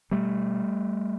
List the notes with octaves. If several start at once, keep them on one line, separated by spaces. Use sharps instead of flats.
B2 G3 A3